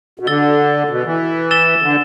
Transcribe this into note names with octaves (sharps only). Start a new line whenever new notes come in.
B2
D3 E6 A6 G7
B2
E3
E6 A6 E7 G7
D3